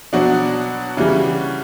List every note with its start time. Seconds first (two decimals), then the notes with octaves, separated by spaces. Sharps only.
0.13 B2 F#3 D4 F#4
0.97 C#3 E3 G3